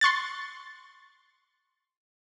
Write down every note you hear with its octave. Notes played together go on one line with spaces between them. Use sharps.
C6 C#6 F#6 A6